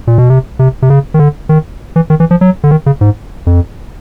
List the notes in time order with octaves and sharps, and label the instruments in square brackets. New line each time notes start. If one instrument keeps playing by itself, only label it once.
[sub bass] A#2
B2
C3
C3
C3
C#3
D#3
D3
D#3
E3
D#3
E3
F3
F#3
D3
D#3
C#3
G#2
F2